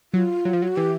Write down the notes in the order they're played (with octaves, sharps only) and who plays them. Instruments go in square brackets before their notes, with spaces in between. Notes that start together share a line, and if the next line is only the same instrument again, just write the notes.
[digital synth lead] F#3 [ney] F4
[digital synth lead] F#3
F3
F#3
[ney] F#4
[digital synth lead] E3 [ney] G4